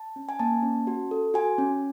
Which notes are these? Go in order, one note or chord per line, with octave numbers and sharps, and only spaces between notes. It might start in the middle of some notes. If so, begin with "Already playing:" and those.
Already playing: A5
C#4
G#5
A#3 A5
C#4
F#4
A4
F#4 G#5
C#4